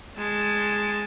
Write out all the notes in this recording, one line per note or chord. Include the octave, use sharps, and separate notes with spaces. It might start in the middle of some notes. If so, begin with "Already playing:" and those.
G#3 A5